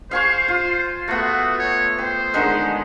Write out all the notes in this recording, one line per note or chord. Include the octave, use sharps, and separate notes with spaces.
C5 F5 G#5 C#6
F4
A3 B3 F#4
C#5
C5 G5
D3 D#3 G#3